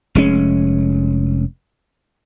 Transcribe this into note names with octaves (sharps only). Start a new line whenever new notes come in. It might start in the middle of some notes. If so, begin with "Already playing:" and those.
F1 G#3 C#4